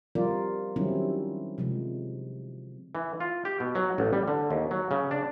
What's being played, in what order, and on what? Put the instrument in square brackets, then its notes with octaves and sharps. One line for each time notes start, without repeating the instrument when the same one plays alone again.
[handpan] F3 G3 C4 F4 A#4 D5
D#3 F#3 G3 C4 C#4 E4
C3 F3 G#3
[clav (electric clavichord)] E3
F4
G4
B2
F#3
A1
G3
D3
D#2
F#3
C#3
D4